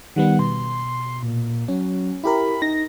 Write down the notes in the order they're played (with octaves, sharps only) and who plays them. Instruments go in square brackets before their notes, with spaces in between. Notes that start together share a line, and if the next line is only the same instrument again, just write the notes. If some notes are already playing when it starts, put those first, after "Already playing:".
[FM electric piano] D#3 G3 B3 [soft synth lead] F#5
[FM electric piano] B2 [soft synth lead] C6
[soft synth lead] A#2
[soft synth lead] F#3 [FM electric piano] C#4
[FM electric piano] E4 G4 A#4 [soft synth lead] B5
[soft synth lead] D#4 [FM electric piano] A#6